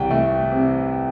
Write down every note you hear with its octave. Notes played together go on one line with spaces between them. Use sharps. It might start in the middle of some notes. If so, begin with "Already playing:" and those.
Already playing: C2 E3 G5
A3
C3